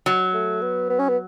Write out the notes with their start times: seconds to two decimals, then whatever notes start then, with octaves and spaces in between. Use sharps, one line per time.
0.06 F#3
0.34 A3
0.62 B3
0.90 B3
0.99 C#4
1.09 B3